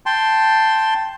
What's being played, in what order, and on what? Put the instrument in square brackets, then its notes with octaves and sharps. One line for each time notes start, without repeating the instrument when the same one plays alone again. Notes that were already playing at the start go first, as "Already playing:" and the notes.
[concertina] G5 A5 C6